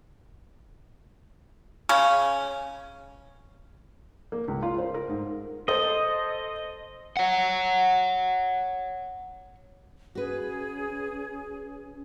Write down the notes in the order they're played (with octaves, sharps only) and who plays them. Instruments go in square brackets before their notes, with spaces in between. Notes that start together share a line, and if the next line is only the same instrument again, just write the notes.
[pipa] C#3 C#4
[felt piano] A#3
C#2
F4
C5
A#4
G#2
[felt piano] A4 C5 [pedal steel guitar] D#5
[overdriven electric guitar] C#5 F#5
[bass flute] C#4 [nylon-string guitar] F#4 B4 [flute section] G#4